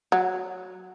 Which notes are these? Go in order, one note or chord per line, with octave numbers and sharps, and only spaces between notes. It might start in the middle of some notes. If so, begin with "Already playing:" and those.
F#3